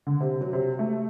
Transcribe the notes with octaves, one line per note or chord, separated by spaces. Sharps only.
D3
C3
F#3
C3
A3